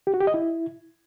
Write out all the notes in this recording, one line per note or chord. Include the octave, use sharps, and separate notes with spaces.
G4
F#4
G4
D#5
E4